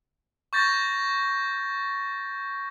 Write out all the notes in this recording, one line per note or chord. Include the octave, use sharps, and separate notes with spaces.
C#6 G6 A6 A#6